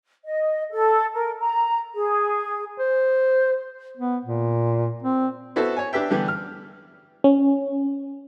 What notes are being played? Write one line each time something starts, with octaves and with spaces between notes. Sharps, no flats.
D#5
A4
A#4
A#5
G#4
C5
B3
A#2
C4
B3 E4 F#4 A4 C5
C#5 G#5
D4 G4 B4 E5 G5
D3 E3 G3 B3
F6
C#4